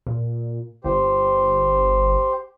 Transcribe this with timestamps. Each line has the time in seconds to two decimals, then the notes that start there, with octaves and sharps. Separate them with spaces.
0.07 A#2
0.84 G1 G4 C5